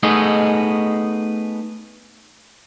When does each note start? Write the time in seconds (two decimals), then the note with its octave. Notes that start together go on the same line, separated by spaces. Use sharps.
0.03 A3 B3 D#4 G#4 D#5